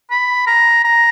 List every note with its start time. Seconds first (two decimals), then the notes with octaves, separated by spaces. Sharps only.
0.11 B5
0.47 A#5
0.84 A#5